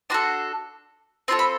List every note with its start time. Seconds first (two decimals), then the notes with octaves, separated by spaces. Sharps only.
0.10 D4 F#4 A4 C6
1.28 C4 F4 A4 C6
1.39 B5